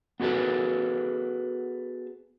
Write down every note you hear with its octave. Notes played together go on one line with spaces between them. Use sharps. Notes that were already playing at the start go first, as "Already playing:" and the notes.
B3 F#4 G#4 A4 B4